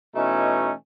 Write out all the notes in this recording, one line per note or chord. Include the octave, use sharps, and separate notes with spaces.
B2 E3 A3 C#4 D#4